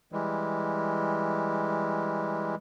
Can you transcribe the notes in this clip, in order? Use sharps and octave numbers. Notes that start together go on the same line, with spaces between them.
E3 G3 G#3